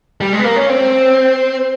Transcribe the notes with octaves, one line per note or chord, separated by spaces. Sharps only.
G3
G#3
B3
A#3
C#4
C4